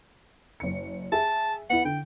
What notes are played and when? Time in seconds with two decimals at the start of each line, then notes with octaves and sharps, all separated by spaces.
0.60 F#1 C#7
1.12 G#4 E5 A5
1.70 B3 E4 F#5
1.85 D3 G5